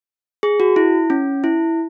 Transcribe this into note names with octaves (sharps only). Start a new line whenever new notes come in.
G#4
F#4
E4
C#4
E4